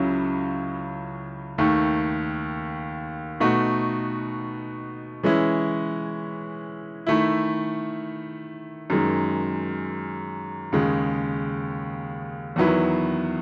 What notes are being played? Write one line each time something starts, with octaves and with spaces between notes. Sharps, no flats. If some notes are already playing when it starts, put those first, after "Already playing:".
Already playing: C#2 C#3 F#3 C#4 E4
D#2 D#3 A3
B2 A3 D#4 F#4
E3 G#3 C#4 E4
D#3 A3 E4
F#2 D#3 G#3
D#2 C#3 G#3
E2 D#3 F#3 B3 E4